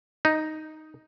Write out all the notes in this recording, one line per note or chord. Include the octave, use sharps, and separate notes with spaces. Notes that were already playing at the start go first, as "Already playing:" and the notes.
D#4